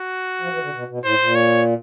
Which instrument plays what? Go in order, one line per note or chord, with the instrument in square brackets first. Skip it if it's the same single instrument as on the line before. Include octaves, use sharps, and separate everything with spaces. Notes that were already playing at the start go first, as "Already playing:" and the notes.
Already playing: [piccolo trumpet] F#4
[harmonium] F3
E3
D3
B2
B2
[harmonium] A2 [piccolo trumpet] C5
[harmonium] A#2
[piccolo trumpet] C#5